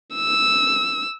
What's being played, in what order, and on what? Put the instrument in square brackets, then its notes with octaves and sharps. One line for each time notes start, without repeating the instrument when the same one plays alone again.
[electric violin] E6